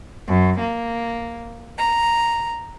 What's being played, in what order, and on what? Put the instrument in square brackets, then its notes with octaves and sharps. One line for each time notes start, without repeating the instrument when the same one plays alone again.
[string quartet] F#2
A#3
A#5